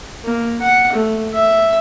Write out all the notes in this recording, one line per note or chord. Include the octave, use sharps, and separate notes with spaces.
A#3
F#5
A3
E5